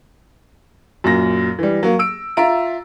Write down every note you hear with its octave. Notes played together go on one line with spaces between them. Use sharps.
F#2 A#2 A#6
E3 G3
F#3 A#3
E6 D7
F4 E5 A#5 D7